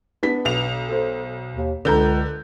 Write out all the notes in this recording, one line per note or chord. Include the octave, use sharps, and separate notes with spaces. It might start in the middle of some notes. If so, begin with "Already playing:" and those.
B3 D4 B6
B1 F7
A4 C5
D#2
C#2 D3 A#4 B4 A#5 G6